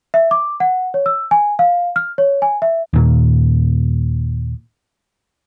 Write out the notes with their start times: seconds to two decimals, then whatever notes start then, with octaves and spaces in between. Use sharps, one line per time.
0.14 E5
0.31 D6
0.60 F#5
0.94 C#5
1.06 E6
1.31 G#5
1.59 F5
1.96 F6
2.18 C#5
2.42 G#5
2.62 E5
2.93 D#2 A#2